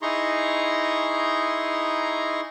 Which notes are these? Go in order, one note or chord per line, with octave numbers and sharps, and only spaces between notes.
D#4 E4 G#4 A#5 C6 C#6